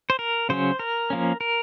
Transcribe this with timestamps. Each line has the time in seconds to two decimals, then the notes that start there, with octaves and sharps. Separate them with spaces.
0.10 C5
0.19 A#4
0.49 C#3 F#3 C#4 C5
0.79 A#4
1.10 F3 A#3 C#4
1.41 A#4